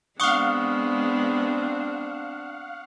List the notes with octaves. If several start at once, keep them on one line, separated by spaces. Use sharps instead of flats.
G#3 B3 C4 D4 F5 F#5 C#6 D#6